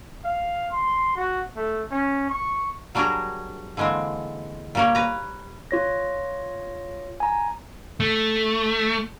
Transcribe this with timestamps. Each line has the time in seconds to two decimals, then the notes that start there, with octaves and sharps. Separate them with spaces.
0.25 F5
0.72 C6
1.16 F#4
1.57 A3
1.91 C#4
2.30 C#6
2.95 F#3 G3 D4 F#4 G#4 A#4
3.77 D3 E3 G#3 A#3 C4
4.75 A#2 G3 A#3 G4 C#5
4.95 B4 A#5
5.71 F4 C#5 A#6
7.20 G#5 A#5
8.00 A3